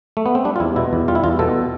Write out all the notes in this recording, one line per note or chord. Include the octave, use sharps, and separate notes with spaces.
A3
B3
C4
G3 D4
F4
E2 E4
B2 E4
E2
G3 F4
E4
E2 F4
B2 A4